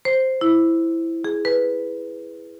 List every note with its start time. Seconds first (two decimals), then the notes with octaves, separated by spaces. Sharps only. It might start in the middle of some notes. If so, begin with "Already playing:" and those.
0.05 C5
0.41 E4
1.25 G#4
1.45 B4